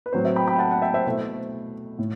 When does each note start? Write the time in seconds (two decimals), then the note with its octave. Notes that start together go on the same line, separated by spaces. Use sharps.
0.06 B4
0.13 A2 F#3 C4 C5
0.25 C5 E5
0.36 G5 B5
0.48 G5 B5
0.59 F#5 A5
0.71 F#5 A5
0.82 E5 G5
0.94 C5 E5
1.06 B2 A3 E4 C5
1.98 A2